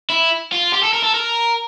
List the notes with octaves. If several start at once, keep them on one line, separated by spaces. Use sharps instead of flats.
E4
F4
G4
A4
A#4
A4
A#4